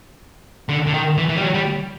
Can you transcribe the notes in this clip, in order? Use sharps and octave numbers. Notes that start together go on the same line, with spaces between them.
D3
D3
D#3
E3
E3
G3
F#3
G3